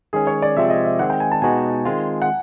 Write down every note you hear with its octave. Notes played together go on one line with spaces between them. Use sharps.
D#3 G#3 C#4 G#4
C#5
D5
C3 F3 G#3 C4 F4 E5
D#5
E5
D#3 G#3 C4 F#5
G5
G#5
A5
B2 G#3 B3 D#4 F#4 G#5
D#3 G#3 C4 F4
F#5